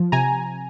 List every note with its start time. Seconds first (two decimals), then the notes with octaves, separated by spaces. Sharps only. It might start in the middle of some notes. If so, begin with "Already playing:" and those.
Already playing: F3
0.12 C3 G#5 A#5